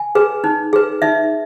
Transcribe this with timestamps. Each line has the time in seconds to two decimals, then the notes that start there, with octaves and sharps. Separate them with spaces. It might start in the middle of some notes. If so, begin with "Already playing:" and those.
Already playing: G#5
0.15 G#4 B4
0.44 D#4
0.73 G#4 B4
1.02 D#4 E5